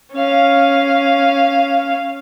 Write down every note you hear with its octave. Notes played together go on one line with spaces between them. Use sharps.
C#4 F5